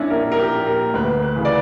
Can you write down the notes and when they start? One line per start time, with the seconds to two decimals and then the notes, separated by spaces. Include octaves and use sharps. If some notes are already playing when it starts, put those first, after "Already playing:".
Already playing: A#1 A#2 C#4 D4 E4
0.10 A#1 A#4
0.32 A#4
0.39 G4
0.53 A#2
0.67 A#4
0.94 D2 B4
1.22 B4
1.36 C#3 E3
1.45 D5